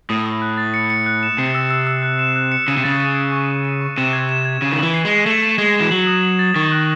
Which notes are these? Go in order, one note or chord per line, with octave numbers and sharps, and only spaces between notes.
A2 D#6
D#6
F#6
A6
C#7
C#7
F#6
E7
C3 C7
E6
E6
E6
F#6
E7
F#6
C#7
C#3 D#7
C3
C#3 A6
D#7
A6
C#6
C#6
D#7
C#6
C3 E7
G#6
E7
G#6
C#3 D#7
D#3
F#7
E3
C7
G#3 D#7
A3 E7
E7
G#3 G#6
E7
E3
F#3 F#7
D#6
F#7
A6
D#3 C#6
F#6